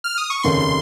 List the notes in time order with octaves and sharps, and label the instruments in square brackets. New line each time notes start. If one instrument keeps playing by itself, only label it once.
[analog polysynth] F6
D#6
C#6
[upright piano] F1 D#2 C#3 [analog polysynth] C6
[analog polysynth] C6